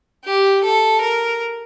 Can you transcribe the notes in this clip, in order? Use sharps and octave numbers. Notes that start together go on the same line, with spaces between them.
G4
A4
A#4